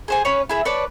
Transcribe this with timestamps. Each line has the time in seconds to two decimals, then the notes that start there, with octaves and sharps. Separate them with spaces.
0.08 G#4 C5 G#5
0.25 C#4 B4 C#5
0.49 E4 G#4 E5
0.65 B4 C#5 D5 A5